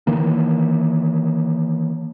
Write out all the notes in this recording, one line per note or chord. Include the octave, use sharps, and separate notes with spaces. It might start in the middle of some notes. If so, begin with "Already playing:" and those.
D#3 E3 A#3